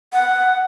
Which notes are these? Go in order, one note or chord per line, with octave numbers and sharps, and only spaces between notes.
F#5